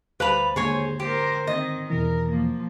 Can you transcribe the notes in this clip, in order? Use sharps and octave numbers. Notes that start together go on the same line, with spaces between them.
D2 G3 B4 C5 F5 A#5 B5
D#2 G#2 D3 G#4 C5 C#5 G#5
G4 A#4 C5
D#3 C4 D#5
E2 B2 E3 A#4
F3 A#3